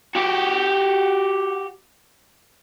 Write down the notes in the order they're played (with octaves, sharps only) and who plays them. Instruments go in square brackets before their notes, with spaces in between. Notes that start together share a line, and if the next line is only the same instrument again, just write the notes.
[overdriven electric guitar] F#4 G4